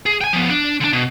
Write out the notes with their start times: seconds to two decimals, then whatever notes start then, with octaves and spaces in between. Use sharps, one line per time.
0.06 G#4
0.21 G5 G#5
0.33 F3 B3
0.49 D4
0.81 D3 D4
0.93 B2